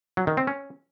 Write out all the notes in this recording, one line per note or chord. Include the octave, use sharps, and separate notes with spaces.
F#3
D#3
C4
C#4